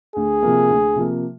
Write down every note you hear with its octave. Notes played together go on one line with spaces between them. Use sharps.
D2 G#4
C3 F3 A#3
D2
C3 F3 A#3